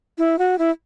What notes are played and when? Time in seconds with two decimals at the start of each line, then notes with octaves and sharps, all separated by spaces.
0.18 E4
0.39 F#4
0.59 E4